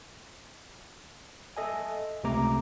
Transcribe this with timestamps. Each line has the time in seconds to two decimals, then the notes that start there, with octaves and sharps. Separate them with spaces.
1.57 A4 D#5 E5 G#5
2.24 C#2 C3 A3 C4 A#5 D6